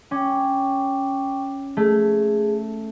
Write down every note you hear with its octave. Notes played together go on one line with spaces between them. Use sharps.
C#4 G5 C#6 D6
A3 G#4